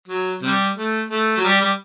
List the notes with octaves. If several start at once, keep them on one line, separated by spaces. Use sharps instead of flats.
F#3
C3 G3
A3
A3
F#3
G3
G3